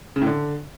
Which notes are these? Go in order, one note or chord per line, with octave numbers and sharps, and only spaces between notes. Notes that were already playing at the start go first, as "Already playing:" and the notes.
C#3
A2
D3